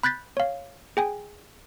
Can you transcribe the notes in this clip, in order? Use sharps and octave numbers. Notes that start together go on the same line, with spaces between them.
B5 F#6 G6 A6 B6
C#5 F5
G#4 G5 G#5